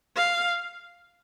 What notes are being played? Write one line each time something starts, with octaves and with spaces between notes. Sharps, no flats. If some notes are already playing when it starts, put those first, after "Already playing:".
F5